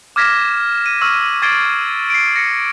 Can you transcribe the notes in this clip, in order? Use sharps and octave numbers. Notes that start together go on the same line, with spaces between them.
D6 F6 G#6 A#6 B6 E7
D#7
C#6 E6 F6
D6 G#6 A6 C7 D7 G7
C7 D7
A#6 C#7